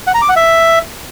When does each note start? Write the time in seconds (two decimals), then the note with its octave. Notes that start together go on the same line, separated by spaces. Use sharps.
0.07 F#5
0.14 A#5
0.22 D6
0.29 F#5
0.36 E5